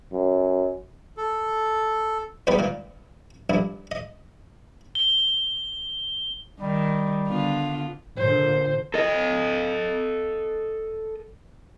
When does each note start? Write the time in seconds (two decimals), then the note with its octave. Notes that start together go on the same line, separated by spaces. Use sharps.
0.12 F#2
1.17 A4
2.47 E2 G#2 G3 B3 D#4 B4
2.59 A#2 D#3
3.50 A#1 G2 E4
3.91 D#5
4.95 G7
6.60 D#3 G3
7.27 D3 B3 F4
8.17 A#2 D3 C5
8.94 A4 D#5